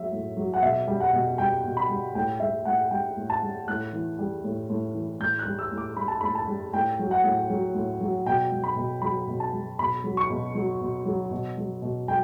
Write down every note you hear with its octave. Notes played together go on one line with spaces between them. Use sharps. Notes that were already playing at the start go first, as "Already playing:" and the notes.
Already playing: A2 F#3 E5
A2
F#3
F#5
B2 E5
G3
F#5
B2
G3 G5
B2
B5
G3
A2 G5
G3 E5
A2 F#5
G3 G5
A2
A5
G3
A2 F#6
E3
G3
A2
A2
E3
A2 G6
F#6
G3
E6
A2
D6
G3 B5
A5
A2 B5
A5
G3
A2 G5
F#3
F#5
A2
F#3
A2
F#3
B2 G5
F#3
B5
B2
F#3 B5
B2
A5
F#3
B2 B5
F#3
C#6
B2
F#3
B2
F#3
B2
F#3
B2
F#3 G5